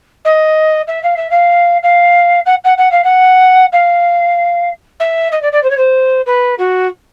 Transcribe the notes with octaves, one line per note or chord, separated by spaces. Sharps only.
D#5
E5
F5
E5
F5
F5
F#5
F#5
F#5
F5
F#5
F5
E5
D#5
D5
D5
C5
C#5
C5
B4
F#4